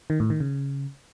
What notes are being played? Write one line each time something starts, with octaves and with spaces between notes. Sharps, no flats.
D#3
A2
D#3
C#3